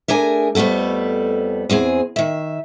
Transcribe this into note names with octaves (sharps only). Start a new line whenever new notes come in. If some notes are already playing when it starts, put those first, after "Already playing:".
A3 D4 G#4 A#4 G#5
F2 G3 A3 B3 A4
E2 C4 G#4 G#5
D#3 E5